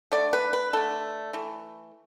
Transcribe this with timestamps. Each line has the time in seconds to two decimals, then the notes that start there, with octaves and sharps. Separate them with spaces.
0.12 D3 A3 D5
0.33 B4
0.53 B4
0.73 D3 A3 A4
1.33 E3 A3